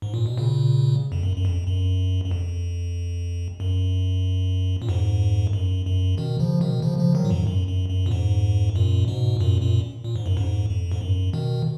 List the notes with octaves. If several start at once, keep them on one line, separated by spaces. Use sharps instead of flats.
G#2
A#2
B2
A#2 C#3
F2
F#2
F#2
F2
F#2
F#2
F2
F#2
A#2
F2 G#2
F#2
F#2
B2 D#3
C#3 F3
B2 D#3
C#3 F3
C#3 F3
D#3 F#3
A#2
F2 G#2
F#2
F#2
F#2
A#2
F2 G#2
F#2 A#2
G#2 B2
F#2 A#2
F#2 A#2
A#2
G#2
F#2
F2 G#2
F2
G#2
F#2
B2 D#3